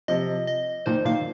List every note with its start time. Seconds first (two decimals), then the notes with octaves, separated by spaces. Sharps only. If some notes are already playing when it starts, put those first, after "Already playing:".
0.08 C3 F3 D#5
0.47 D#5
0.86 A#2 D#3 C5
1.05 A#2 D#3 F5